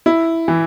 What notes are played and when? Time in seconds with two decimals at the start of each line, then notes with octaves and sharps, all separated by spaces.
0.06 E4
0.48 E3